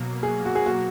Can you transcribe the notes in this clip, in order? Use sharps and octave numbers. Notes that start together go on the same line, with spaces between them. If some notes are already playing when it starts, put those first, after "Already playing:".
Already playing: B2 F#3 A#3
G#4
F#4
G#4
F#4